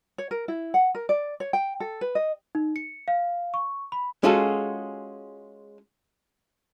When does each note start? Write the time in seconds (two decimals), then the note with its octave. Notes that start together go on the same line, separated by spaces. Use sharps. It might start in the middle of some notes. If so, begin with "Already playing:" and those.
0.18 C#5
0.31 A#4
0.48 E4
0.74 F#5
0.95 A#4
1.09 D5
1.40 C#5
1.53 G5
1.80 A4
2.01 B4
2.15 D#5
2.55 D#4
2.76 C#7
3.08 F5
3.54 C#6
3.92 B5
4.23 G#3 C#4 F4 F#4 G#4 A4